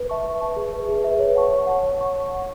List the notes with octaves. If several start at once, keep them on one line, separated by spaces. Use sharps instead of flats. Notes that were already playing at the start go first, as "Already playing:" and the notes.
Already playing: B4
E5 A5 C#6
B4
E5 A5 C#6
G#4
B4 E5
G#4
B4 E5
C#5
F#5 A5 C#6
C#5
F#5 A5 C#6
C#5
F#5 C#6
C#5
F#5 C#6